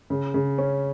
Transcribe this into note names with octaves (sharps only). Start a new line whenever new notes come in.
C#3
C#3
C#4